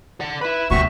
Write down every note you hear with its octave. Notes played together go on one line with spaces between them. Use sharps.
D5 F#5
E4 B4 B5
D2 G2 C3 A#3 F#4 E5 C#6